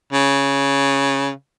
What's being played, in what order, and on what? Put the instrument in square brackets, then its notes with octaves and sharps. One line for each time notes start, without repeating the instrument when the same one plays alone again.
[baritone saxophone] C#3